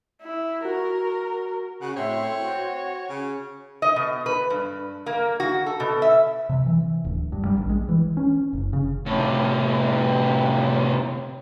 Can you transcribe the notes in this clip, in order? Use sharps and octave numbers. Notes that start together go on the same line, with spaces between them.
E4
F#4 A#4
C#3 F#4 F#5 F#6
A2 C4 C#5 E5 C6
F#4
C#3
D#5
B2
B4
G2
A#3
F#4
A4
B2
E5
C3
E3
D1
G2
G3
A#1
G#3
E3
C#4
F#1
C#3
A2 C3